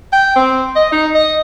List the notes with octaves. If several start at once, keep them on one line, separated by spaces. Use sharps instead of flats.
G5
C4
D#5
D#4
D#5